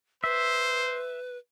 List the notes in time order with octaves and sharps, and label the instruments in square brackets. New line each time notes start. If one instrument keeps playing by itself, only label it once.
[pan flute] B4 [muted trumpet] C5 [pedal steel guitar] E5